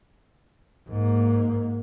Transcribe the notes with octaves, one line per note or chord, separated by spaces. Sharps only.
G#2 A#3